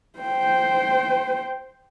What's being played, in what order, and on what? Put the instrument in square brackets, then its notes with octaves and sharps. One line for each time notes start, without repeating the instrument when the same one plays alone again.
[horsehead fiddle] C5 G5